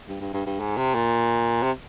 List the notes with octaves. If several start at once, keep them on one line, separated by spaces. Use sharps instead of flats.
G2
G2
G2
G2
G#2
C3
A#2
C3